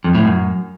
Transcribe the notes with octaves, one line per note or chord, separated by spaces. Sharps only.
F2
A2
F#2